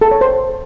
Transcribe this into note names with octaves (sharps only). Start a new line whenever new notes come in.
A4
C#5
C5